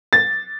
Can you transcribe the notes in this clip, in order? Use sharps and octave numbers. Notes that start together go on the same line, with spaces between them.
A6